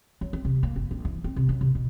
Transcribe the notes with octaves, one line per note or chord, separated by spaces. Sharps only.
F#3
C4
C3
A#3
F#1
A#1
E3
C4
C3
F#2
C3
B2